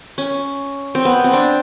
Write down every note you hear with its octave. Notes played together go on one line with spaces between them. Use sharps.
C#4
C4
B3
C4
D4